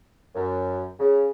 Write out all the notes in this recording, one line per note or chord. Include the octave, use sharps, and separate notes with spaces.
F#2
C#3